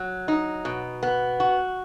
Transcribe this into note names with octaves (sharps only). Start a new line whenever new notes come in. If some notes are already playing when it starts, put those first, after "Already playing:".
Already playing: F#3
D#4
B2
B3
F#4